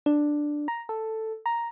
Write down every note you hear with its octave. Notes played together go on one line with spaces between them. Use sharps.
D4
A#5
A4
A#5